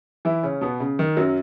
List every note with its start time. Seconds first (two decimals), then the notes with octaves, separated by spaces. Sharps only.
0.25 E3 E4
0.43 C#3 C#4
0.61 B2 B3
0.80 C#3
0.99 D#3
1.17 F#2 F#3